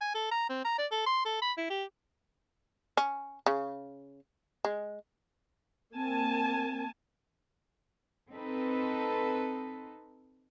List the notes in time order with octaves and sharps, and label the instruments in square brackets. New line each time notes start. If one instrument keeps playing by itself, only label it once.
[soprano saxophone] G#5
A4
A#5
C4
A#5
D5
A4
C6
A4
B5
E4
G4
[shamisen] C#4
C#3
G#3
[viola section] A#3 G#5 A5 [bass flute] C4
[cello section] C4 D#4 A4 B4